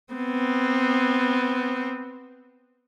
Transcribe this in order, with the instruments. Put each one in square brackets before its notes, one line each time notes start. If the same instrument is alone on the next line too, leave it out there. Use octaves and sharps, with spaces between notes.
[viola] B3 C4